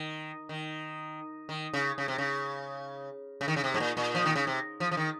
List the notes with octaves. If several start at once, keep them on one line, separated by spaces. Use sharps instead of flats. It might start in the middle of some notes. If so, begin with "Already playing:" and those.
Already playing: D#3
D#3
D#3
C#3
C#3
C3
C#3
C#3
D#3
C#3
C3
G#2
A#2
A#2
F3
D#3
C#3
C3
F3
F3
D#3